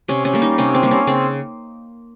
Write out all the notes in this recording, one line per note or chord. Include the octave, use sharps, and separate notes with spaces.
C3 C#4
C#4
G3 A#3
D#4
C3 C#4
C4
G3 A#3
C#4
C#3 C4